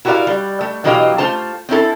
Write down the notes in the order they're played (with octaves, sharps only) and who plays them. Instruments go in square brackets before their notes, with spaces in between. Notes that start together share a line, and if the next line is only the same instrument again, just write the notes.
[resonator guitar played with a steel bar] E4 F#4 G4 A#4 D5 F5
G3
A3
B2 E3 F#3 G4 D#5 F5
A3 F4 C5 A5
C4 C#4 E4 A4